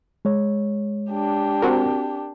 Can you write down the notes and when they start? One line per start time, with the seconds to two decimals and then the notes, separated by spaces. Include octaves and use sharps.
0.25 G#3 C#5
1.11 D4 G4
1.62 C4 F#4 A#4